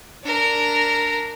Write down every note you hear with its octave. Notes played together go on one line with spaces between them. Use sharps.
D4 A#4